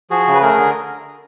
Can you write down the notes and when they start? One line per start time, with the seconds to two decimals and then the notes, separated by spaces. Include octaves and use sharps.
0.10 F3 F#4 G#4
0.27 C#3
0.34 B4
0.42 A3 G#4 A#4
0.58 D3